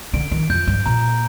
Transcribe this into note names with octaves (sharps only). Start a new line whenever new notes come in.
D3 D7
D#3
F2 G6
G2
A#2 A#5